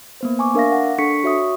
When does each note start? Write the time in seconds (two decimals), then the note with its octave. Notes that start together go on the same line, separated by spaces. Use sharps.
0.21 A#3 B3 C5
0.39 G#5 C#6 D6
0.55 D4 A#4 E5 F5 D6 A#6
0.72 F#5
0.99 D4 A4 C#6 B6 C#7
1.24 F#4 C#5 E5 C#6 D#6